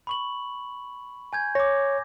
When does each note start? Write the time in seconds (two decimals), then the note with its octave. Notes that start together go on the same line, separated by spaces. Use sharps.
0.07 B5 C#6 F#7
1.33 G#5 G6 G#6
1.55 C#5 D6 A#6